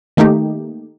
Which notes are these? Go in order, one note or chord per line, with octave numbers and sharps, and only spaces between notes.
D#3 A3 A#3 D#4 G4